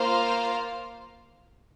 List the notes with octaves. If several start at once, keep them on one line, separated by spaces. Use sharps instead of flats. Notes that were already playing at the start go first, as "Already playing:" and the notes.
Already playing: A#3 F4 C5 F5